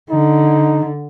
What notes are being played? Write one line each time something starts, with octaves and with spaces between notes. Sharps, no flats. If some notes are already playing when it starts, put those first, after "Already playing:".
D3 D#4